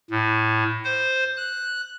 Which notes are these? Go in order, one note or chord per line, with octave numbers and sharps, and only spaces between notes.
A2
C5
F#6